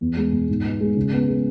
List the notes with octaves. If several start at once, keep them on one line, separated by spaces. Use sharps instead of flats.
E2
G#3
B2
G#2
B3
G#3
C#3
B3
G#3